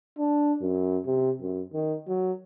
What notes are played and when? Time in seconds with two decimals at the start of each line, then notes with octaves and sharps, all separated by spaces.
0.19 D4
0.62 F#2
1.06 C3
1.41 F#2
1.73 D#3
2.08 F#3